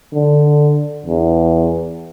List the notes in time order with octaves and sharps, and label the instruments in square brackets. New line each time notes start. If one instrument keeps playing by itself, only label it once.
[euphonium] D3
E2